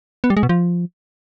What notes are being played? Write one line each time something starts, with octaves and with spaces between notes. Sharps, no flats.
B3
G3
G#3
B2
F3